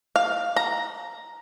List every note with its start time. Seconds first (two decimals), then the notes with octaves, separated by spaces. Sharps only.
0.16 F5
0.56 A#5